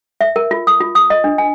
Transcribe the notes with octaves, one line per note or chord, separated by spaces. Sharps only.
E5
A#4
F4
D#6
F4
D#6
D#5
D4
G#5